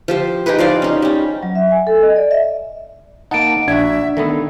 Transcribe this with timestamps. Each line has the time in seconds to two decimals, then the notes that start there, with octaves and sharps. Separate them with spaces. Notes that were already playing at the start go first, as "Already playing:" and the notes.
0.08 F3 G4 C5
0.46 D#4 G4 G#4 B4
0.58 F3 C5 D5 F5
0.82 C#4 D#4
1.02 G3 C#4
1.43 F#3
1.55 E5
1.71 G#5
1.87 A4
2.02 D#5
2.16 D5
2.31 E5
3.31 A#3 D#4 F#5 A5 D7
3.68 A#1 D4 F#4 E5 G#6
4.17 D#3 A3 B3 A4